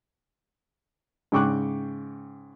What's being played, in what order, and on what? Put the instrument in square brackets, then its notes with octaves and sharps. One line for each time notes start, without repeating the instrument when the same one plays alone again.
[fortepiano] G#2 C#3 G5 C#6 D6 F#6